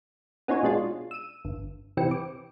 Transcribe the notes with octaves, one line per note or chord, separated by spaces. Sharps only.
B3 C#4 D#4 F4 C#5 G#5
B2 G#3 D4 F4
E6 D#7
G1
C3 E3 C4 C#7
D6